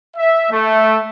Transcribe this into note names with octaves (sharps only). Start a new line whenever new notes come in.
E5
A3